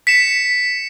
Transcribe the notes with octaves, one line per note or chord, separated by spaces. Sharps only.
B6 C#7 E7